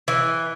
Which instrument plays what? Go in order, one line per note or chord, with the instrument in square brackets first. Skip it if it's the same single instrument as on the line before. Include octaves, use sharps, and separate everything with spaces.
[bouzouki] E3